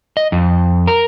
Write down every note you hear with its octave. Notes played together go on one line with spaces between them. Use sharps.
D#5
F2
A#4